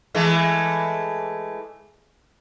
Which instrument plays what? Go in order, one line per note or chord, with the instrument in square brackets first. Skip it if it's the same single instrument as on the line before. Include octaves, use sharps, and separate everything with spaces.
[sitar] E3 G#3 A3